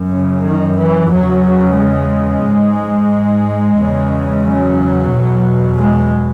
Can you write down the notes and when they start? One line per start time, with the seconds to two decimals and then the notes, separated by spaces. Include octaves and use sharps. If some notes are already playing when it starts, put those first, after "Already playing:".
Already playing: F#2
0.10 C#3
0.44 D#3
0.77 E3
1.10 E2 C#3 F#3
1.77 G#3
2.44 G#2
3.76 E2 C#3
4.43 F#3
5.09 E2 B2
5.76 G#3